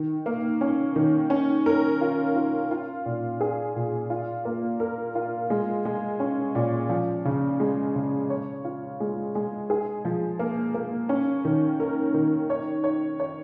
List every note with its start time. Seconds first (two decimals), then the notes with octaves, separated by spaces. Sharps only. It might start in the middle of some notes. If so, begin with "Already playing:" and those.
Already playing: D#3
0.26 A#3
0.61 C#4
0.96 D#3
1.30 C#4
1.66 A#4
2.01 F4
2.36 F4
2.71 F4
3.06 A#2
3.41 G#4
3.76 A#2
4.10 F4
4.45 A#3
4.80 A#4
5.15 F4
5.50 G#3
5.85 G#3
6.20 C#4
6.55 A#2
6.89 F3
7.25 C#3
7.60 G#3
7.95 C#3
8.30 C#5
8.65 F4
9.00 G#3
9.35 G#3
9.70 G#4
10.05 F3
10.39 A#3
10.74 A#3
11.09 C#4
11.45 D#3
11.80 A#4
12.14 D#3
12.50 C#5
12.84 C#5
13.20 C#5